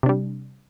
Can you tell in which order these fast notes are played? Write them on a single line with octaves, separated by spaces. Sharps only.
C3 D4 G3